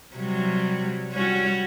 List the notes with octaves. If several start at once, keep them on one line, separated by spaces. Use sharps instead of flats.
C3 F#3 G3
G3 C#4 F#4